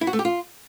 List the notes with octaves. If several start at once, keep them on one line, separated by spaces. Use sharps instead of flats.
E4
F#4
A3
G4
F4